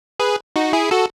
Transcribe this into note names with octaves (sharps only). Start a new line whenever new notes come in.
G#4 B4
D#4 F#4
E4 G#4
F#4 A4